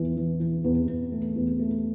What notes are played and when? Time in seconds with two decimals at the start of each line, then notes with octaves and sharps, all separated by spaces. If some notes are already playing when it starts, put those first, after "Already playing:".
Already playing: E2 E3
0.17 E3
0.40 E3
0.64 E2
0.88 E2
1.12 A3
1.36 E2
1.59 A3